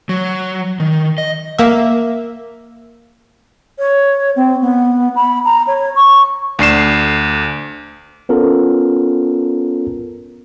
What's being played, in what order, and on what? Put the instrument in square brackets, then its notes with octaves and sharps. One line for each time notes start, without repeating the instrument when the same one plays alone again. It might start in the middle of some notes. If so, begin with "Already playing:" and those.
[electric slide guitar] F#3
D#3
D#5
[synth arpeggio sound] A#3 E5
[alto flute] C#5
C4
B3
B5
A#5
C#5
C#6
[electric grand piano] D2 D4 C7 E7
[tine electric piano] B3 C#4 F4 A4 A#4